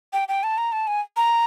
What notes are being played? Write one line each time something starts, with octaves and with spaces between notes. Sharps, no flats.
G5
G5
A5
A#5
A5
G#5
A#5